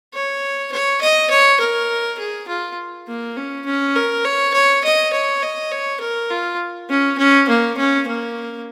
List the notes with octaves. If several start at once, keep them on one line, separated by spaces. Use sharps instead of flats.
C#5
C#5
D#5
C#5
A#4
G#4
F4
A#3
C#4
C#4
A#4
C#5
C#5
D#5
C#5
D#5
C#5
A#4
F4
C#4
C#4
A#3
C#4
A#3